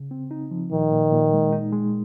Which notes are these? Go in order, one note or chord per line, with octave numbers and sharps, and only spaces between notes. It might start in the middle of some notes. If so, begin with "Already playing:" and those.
Already playing: C#3
C4
D#4
F3
A#2 D#3
A#2
A#2
G#3
D#4
G#3